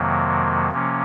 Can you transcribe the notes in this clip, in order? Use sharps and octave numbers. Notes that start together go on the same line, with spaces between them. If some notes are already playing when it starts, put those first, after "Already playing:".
Already playing: F2 C3 D#3 F#3 A#3
C3 F3 A#3 C#4